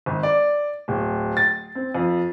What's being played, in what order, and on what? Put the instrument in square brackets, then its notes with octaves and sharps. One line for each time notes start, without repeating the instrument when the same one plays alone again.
[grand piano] G#1
D5
D1
A6
C4
F2